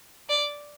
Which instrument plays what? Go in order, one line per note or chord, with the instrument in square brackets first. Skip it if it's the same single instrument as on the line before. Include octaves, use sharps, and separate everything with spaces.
[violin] D5